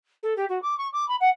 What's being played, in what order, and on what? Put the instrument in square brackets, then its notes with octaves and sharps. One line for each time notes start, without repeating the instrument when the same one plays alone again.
[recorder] A4
G4
F#4
D6
C#6
D6
B5
F#5